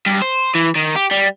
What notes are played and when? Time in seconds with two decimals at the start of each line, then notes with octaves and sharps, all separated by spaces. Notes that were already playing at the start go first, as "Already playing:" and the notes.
0.07 G2
0.22 C5
0.55 E3
0.75 D#3
0.96 G4
1.11 G3